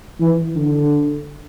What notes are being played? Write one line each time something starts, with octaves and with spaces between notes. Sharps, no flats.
E3
D3